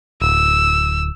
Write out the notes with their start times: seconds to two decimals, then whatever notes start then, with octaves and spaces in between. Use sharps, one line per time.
0.21 D1 E6